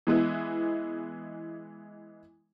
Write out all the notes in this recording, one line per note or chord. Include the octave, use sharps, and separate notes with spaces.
E3 G#3 B3 E4